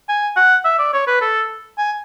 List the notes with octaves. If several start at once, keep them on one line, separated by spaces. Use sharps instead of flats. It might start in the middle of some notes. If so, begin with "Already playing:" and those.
G#5
F#5
E5
D5
C#5
B4
A4
G#5